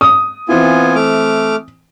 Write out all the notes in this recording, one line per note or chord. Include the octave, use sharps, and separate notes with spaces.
D#6
E3 B3 C4 E4 F4 G#5
A3 D6 F6